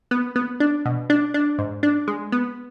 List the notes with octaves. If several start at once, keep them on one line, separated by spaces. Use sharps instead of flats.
B3
B3
D4
B2
D4
D4
G#2
D4
G#3
B3